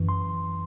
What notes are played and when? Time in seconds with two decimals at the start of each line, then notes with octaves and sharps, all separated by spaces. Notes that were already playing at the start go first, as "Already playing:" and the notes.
Already playing: F#2 E3
0.09 C6